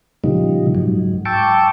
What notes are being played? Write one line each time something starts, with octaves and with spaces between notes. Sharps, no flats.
A#2 C#3 F3 G3 D#4
G#2 F#3
G5 A5 C#6 D6 E6